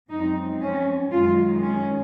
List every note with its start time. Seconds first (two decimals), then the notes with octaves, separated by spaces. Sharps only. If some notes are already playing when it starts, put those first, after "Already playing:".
0.10 F#2 F3 G#3 C4 D#4
0.62 C#4
1.11 F#2 D#3 G#3 F4
1.62 C#4